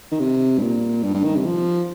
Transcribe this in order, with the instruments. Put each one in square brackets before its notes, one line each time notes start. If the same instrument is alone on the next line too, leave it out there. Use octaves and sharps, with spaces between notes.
[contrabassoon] D#3
C3
G2
A#2
G2
G2
D#3
C3
F3